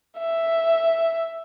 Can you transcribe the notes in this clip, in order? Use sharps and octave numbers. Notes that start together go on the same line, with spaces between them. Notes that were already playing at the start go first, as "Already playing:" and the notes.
E5